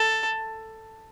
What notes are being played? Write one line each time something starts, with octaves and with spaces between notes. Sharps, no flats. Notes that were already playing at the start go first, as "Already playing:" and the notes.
Already playing: A4